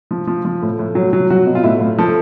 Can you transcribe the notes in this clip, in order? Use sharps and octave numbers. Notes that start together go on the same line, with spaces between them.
F3
F3
F3
A2
A2
F#3
F#3
F#3 F#4
B2
F4
A2 E4
A2
F3 A4